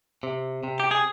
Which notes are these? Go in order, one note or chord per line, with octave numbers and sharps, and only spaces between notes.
C3
C3
G4
G#4